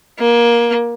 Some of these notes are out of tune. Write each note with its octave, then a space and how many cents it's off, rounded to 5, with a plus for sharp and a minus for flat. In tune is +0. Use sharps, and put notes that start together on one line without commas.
A#3 +20